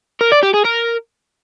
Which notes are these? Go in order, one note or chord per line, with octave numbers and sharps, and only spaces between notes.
A#4
D5
G4
G#4
A#4